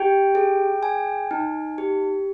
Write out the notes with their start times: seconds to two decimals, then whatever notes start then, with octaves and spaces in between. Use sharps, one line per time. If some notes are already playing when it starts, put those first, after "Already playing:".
Already playing: G4 G5
0.35 G#4
0.83 G#5
1.31 D#4
1.78 G4